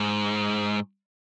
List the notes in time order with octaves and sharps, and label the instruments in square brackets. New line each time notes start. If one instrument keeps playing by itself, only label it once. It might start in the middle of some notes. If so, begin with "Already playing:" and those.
Already playing: [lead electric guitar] G#2